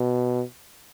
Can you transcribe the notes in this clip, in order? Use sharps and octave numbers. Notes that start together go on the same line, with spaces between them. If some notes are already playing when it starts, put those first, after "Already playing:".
Already playing: B2